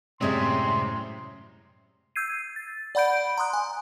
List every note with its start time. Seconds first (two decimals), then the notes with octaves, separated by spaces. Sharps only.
0.21 F#2 A2 C3 G3 G#3 C4 C6
2.16 E6 G6 G#6 C7 D#7
2.56 A6
2.95 D5 F#5 B5 G6 D7
3.38 A#5 C6 D#6 F#6
3.53 G#5